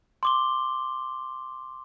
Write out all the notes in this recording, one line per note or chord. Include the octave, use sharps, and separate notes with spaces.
C6 D6 G7